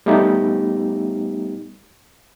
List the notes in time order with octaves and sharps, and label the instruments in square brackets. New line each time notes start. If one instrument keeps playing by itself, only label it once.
[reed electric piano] G3 A3 B3 D#4 G4